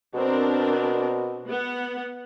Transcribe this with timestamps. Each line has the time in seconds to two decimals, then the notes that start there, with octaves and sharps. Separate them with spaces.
0.14 B2 C4 D4 A#4
1.48 B3 F#5